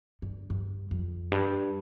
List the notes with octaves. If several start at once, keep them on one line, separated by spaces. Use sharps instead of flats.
G2
G2
F2
G2